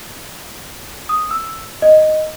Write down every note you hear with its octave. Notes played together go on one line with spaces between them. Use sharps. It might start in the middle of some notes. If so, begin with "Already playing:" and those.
D#6
E6
D#5